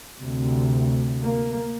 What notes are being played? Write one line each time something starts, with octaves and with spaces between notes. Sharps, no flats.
D2 C3
A#3